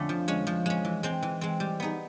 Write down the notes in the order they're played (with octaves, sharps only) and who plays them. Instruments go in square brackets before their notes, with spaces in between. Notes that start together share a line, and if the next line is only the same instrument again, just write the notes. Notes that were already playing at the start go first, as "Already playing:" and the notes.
Already playing: [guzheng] F2 D3 A3 C#4
F3
G#3 C#4
F3
G#3 C#4
E3
G#3 C4
E3
G#3 C4
G3
B3 D#4 G#4